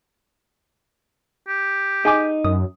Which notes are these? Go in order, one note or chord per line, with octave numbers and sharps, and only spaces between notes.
G4
D#4 G#4 G#5 D6
F#2 D#6